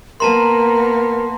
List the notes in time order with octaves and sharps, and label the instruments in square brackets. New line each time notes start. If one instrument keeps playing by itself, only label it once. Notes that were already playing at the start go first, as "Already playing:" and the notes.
[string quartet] A#3 B3 [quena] A#4 [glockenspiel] A5 A#5 C6